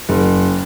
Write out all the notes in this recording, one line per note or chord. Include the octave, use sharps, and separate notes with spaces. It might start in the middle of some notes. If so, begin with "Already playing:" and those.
F#1